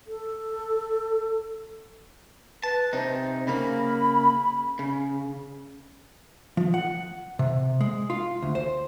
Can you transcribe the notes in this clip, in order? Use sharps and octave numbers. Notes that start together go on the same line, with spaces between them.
A4
B4 A5
C3 D#4 C5
C#3 A#3 B5
C#3
F3
F#5
C3
G#3
F4
D2
C5